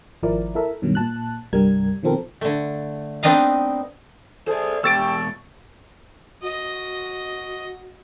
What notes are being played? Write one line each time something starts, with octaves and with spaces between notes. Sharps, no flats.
G#1 F3 E4 A#4 D5
E4 A4 A#4 E5
G2 B2 D#3 F#3
A#2 A5 F#6
C2 G2 G3 A#4 G#6
B2 D#3 F3 C4 A4 A#4
D3 A3
B3 C4 D4 D#4 D#5 F5
G#4 A4 C5 D5
B2 G#3 G4 C#6 E6 A6 D7
F#4 D#5